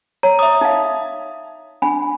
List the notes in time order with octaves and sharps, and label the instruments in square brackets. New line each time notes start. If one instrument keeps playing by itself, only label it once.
[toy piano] C#5 [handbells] A#5
[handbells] E5 D#6 [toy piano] D6
[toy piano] D#4 F5
D4 G#5 B5